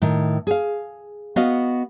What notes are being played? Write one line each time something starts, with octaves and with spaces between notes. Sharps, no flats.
A2 D#3
G#4 F5
B3 F#4 D#5 F5